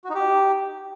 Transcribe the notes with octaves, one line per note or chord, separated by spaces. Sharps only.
F#4
D#4
G4